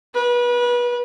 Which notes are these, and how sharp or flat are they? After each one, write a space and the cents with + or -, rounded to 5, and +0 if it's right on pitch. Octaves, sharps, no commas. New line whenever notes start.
B4 -30